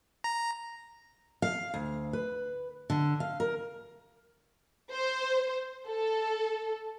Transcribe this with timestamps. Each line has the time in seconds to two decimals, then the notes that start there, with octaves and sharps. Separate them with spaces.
0.24 A#5
1.42 F5
1.74 D2
2.13 B4
2.90 D3
3.20 F5
3.40 A#4
4.92 C5
5.87 A4